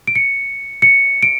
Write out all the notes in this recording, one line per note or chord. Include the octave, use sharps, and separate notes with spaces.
D7
C#7
C#7
D7